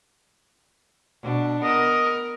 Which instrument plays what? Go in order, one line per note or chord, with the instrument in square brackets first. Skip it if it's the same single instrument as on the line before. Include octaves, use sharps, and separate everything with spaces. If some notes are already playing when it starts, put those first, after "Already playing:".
[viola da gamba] B2 D4
[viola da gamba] B3 A#4 [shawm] D#5